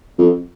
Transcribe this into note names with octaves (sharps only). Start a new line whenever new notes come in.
F2